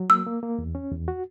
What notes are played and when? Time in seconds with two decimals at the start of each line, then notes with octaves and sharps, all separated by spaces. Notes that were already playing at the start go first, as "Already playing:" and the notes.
Already playing: F#3
0.09 A#3 E6
0.26 A#3
0.43 A#3
0.59 E2
0.75 C#4
0.92 E2
1.08 F#4